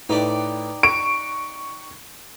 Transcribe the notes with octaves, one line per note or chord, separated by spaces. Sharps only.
A2 D#4 G4 B4 D5
C#6 D7